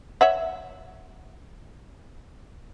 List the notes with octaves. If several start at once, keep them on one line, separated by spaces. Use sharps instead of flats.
C#5 E5 F#5